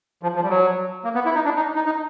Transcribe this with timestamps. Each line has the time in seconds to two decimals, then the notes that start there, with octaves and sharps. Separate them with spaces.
0.23 F3
0.36 F3
0.43 G3
0.50 F#3
1.04 A#3
1.15 B3
1.25 E4
1.35 D#4
1.45 D4
1.56 D#4
1.75 D#4
1.86 D#4